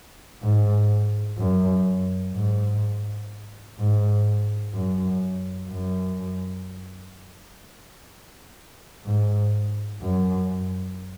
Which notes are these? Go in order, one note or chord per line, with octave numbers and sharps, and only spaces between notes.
G#2
F#2
G#2
G#2
F#2
F#2
G#2
F#2